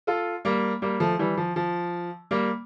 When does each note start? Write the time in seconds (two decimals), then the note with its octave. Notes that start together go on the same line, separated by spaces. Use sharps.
0.07 F4 A4
0.45 G3 A#3
0.82 G3 A#3
1.00 F3 A3
1.19 E3 G3
1.37 F3
1.56 F3
2.31 G3 A#3